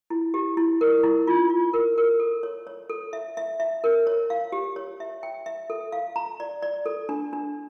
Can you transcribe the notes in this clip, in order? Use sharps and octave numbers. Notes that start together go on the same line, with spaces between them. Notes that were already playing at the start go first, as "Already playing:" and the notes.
E4
G4
E4
A#4
E4
F4
F4
A#4
A#4
A4
C#5
C#5
A4
E5
E5
E5
A#4
C#5
F5
G4
C#5
E5
G5
E5
A4
F5
A#5
D5
D5
A4
D4
D4